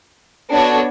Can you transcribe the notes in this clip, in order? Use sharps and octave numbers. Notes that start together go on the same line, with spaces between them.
B3 D4 F#4 A4 C#5